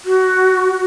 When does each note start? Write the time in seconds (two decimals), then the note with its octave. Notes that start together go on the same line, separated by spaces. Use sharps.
0.05 F#4